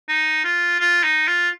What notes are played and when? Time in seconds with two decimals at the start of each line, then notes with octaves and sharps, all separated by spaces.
0.08 D#4
0.44 F4
0.80 F4
1.03 D#4
1.28 F4